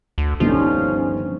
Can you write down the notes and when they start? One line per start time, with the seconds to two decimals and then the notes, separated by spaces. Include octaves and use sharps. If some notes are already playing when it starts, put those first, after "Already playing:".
0.18 D2
0.40 G1 G2 D#3 F3 C#4